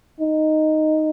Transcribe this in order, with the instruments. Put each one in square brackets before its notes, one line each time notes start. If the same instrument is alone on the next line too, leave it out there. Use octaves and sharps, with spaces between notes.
[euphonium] D#4